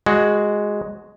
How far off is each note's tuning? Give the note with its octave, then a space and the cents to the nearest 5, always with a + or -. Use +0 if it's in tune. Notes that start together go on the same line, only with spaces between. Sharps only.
G#3 +0 F#4 +0